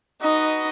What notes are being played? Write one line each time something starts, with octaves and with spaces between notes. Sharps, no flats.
D#4 F#4 B4 D#5